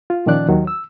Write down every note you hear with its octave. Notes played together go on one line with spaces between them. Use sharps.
F4
A#2 D#3 F3 C#4 D5 F#6
D#2 D#3 F#3
E6